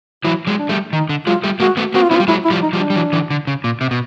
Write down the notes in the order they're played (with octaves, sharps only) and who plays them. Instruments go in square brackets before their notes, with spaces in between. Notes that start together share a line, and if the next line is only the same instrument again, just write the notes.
[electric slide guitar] E3 F#3 [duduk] E4
[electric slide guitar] F#3 G#3
[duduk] D4
[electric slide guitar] G3 A3
[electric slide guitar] D#3 [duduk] D#4
[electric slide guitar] D3
[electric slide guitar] F#3 G#3 [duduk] F4
[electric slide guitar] G3 A3
[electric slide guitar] G#3 A#3 [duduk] F#4
[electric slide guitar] A3 B3
[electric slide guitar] A#3 C4 [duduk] F#4
[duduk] F4
[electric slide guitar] B3 C#4 [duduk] E4
[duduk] F4
[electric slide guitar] G3
[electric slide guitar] F#3 G#3 [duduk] E4
[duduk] E4
[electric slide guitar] F3 G3
[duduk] D#4
[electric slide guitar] F3 G3
[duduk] D4
[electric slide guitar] G3
E3 F#3
D3 E3
D3
C#3
A#2
C3
B2